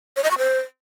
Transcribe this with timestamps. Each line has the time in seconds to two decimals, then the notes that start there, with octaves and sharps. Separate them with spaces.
0.16 C#5
0.24 D#5
0.31 C#6
0.38 C5